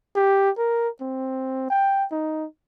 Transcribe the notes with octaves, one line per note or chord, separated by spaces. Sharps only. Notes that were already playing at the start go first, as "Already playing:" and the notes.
G4
A#4
C4
G5
D#4